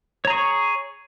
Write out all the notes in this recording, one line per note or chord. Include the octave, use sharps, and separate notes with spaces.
G#4 C#5 A#5 C#6